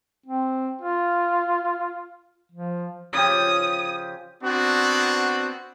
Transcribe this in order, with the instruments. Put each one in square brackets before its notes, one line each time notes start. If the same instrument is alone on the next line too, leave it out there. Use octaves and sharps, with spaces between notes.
[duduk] C4
F4
F3
[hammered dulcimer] C#3 F3 G4 [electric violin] D#6
[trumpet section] B3 C4 D4 F#4